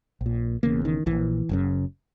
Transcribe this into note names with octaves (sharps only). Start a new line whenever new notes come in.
A#1
A#2
E1 E2 C#3 A#3
D#3
A#1 A#2 E3
F#1 F#2 C#3